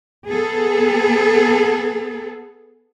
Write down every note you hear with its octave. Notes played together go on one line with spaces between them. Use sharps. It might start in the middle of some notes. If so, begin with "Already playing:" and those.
B3 G#4 A4